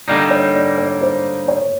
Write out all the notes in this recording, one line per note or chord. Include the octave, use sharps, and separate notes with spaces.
D3 G3 A#3 D#4 D5
C#5
D5
C#5
C5
C#5